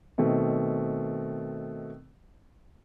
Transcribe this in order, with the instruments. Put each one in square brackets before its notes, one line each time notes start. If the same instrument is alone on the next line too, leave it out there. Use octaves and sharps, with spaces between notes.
[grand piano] B2 D#3 A3 C4